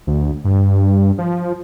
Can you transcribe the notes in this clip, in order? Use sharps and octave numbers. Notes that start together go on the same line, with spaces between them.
D2
G2
F3